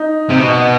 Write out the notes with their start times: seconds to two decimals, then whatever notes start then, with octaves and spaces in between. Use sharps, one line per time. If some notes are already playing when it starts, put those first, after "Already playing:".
Already playing: D#4
0.30 C3
0.39 B2